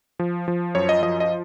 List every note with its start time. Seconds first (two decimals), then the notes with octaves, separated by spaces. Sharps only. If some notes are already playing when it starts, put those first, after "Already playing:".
0.19 F3
0.48 F3
0.75 F#2 C#5
0.89 D#5
1.03 F3 D#5
1.20 D#5